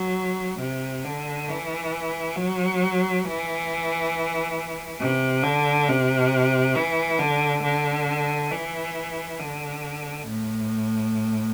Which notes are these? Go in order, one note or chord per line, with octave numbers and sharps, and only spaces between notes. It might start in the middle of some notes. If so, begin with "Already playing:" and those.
Already playing: F#3
C3
D3
E3
F#3
E3
C3
D3
C3
E3
D3
D3
E3
D3
A2